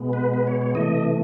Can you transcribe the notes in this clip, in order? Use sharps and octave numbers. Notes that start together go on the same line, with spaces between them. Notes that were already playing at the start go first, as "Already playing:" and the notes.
Already playing: B2 G#3 B3
B4
B4
C#5
C#5
C3 E3 A3 D#5